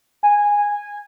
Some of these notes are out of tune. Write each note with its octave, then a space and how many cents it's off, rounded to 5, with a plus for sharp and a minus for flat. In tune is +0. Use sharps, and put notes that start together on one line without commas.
G#5 -10